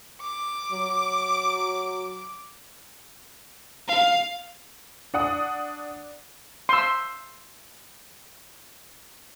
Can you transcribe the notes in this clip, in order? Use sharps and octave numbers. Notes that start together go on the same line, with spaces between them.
D6
F#3
F5
D4 F#5 D#6
C6 E6